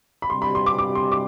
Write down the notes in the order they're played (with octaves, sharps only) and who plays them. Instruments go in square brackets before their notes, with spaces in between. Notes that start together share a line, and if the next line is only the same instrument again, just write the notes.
[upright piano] B5
[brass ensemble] C3 G3 D4 G4 [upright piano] C6
[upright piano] B5
C6
D6
D6
C6
D6